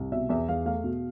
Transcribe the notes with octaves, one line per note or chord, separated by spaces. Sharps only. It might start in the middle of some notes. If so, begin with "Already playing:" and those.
Already playing: C2
B2 E5
E2 E5
E2 F5
A3 F5
B2